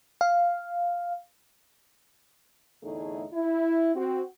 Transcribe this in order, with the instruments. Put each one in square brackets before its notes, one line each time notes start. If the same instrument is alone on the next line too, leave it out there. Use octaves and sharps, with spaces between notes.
[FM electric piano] F5
[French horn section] E2 A2 D3 A3 D#4 G#4
E4
C4 F#4